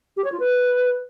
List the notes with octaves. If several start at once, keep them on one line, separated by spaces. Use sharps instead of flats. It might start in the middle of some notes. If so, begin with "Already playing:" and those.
G4
C#5
F4
B4